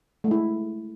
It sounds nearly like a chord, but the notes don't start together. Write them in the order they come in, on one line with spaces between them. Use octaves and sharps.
A3 G#3 E4